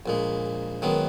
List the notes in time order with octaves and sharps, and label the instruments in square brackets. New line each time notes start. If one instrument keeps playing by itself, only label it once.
[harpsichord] A#1 A#2 G#3
F#2 D#3 G#3 B3